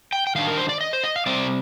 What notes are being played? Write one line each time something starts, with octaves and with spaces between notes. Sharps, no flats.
G5
G5
D#3 G3 D4 F5
A#4
C5
D5
D#5
C5
D#5
F5
C3 G3 C4 D5